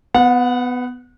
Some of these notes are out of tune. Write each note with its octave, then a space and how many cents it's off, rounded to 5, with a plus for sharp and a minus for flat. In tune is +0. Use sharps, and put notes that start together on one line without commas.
B3 +15 F#5 -30